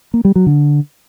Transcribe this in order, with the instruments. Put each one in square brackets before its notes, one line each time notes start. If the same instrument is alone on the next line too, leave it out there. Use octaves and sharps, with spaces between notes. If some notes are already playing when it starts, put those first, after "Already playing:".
[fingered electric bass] A#3
G3
F#3
D3